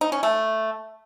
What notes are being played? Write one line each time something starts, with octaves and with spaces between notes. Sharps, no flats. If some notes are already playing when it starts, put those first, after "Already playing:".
D#4
C#4
A3